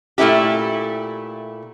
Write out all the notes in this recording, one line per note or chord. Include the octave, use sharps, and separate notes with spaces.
A#2 A3 C4 E4 G4